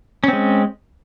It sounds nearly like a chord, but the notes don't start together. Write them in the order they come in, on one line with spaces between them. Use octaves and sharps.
C#4 C4 G#3